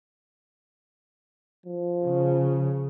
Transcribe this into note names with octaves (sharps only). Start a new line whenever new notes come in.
F3
C#3